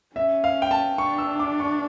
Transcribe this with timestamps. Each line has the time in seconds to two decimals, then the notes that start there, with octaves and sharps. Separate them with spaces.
0.16 C#4 E5
0.44 F5
0.62 G5
0.71 A5
0.98 D4 C#6
1.18 E6
1.39 D6
1.60 C#6